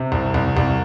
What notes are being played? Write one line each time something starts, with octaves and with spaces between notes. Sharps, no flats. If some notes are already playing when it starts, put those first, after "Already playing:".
Already playing: C3
C2
C2
C2